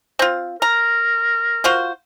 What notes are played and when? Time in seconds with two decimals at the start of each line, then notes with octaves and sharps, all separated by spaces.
0.19 C4 F4
0.62 A#4 A#5
1.64 F4 F#4 C5